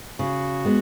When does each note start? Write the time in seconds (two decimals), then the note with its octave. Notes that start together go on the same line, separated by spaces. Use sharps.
0.19 C#3 F#4
0.65 G#3 B3